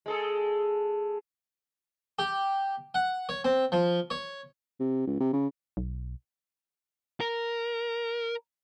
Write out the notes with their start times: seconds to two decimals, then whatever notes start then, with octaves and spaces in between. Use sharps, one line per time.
0.06 G#3 G#4 A4
2.19 G4
2.94 F#5
3.29 C#5
3.45 C4
3.72 F3
4.10 C#5
4.80 C3
5.07 C#2
5.20 C3
5.33 C#3
5.77 B1
7.20 A#4